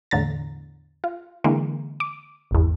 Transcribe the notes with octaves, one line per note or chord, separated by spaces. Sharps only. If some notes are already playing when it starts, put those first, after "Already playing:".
E2 A2 D3 A#5 A6
F4
D3 E3 G#3 A#3
D6
G#1 E2